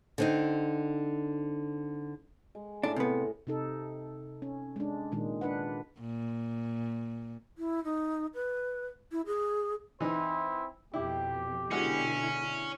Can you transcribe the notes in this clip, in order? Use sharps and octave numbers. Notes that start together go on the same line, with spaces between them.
D3 C4 D#4
G#3
A2 D4
C3 B3
C3 D#4 A4
C#4
G#3 D4
A#2 D#3 G#3
D4 B4 F#5
A#2
E4
D#4
B4
E4
G#4
E3 C4 D#4 E4 C5
F2 B2 E4 G4
B2 D3 G#3 C#4 E4 F#4 G#4